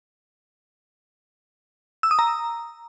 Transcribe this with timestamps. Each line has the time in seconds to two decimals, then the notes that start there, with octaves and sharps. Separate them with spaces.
2.03 E6
2.11 D#6
2.19 A#5